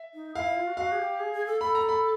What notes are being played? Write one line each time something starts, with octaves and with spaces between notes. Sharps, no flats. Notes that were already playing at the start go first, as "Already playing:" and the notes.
Already playing: E5
D#4
E4 F5
E4
F4
F#4
F#4 F5
G#4
G4
G#4
G#4
A4
A4 B5
A#5
B5